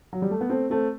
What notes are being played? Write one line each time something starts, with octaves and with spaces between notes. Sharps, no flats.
F#3
G3
A3
B3
A3 C4
A3 C4